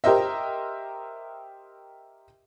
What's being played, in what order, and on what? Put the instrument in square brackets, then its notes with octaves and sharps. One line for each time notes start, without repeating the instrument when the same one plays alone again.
[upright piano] G4 A#4 C5 D#5 E5